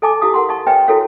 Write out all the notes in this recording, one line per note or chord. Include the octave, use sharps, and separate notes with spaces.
A4 D#5 G#5 A5 D6
E4 G4 F5 D#6
A#4 F#5 C6
D#5 A5 C#6
B4 C#5 D#5 E5 G5 G#5
E4 F#4 A4 A#4 C#5 F5